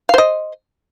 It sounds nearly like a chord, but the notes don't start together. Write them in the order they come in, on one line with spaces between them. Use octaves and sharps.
F5 C5 D#5